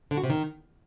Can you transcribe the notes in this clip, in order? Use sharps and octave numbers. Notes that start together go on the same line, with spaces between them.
D3
F#4
C3
D#3